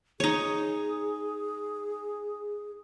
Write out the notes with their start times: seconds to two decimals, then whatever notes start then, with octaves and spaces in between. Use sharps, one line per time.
0.20 D#4 G#4 C#5